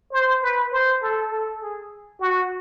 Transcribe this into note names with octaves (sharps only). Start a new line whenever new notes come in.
C5
B4
C5
A4
A4
G#4
F#4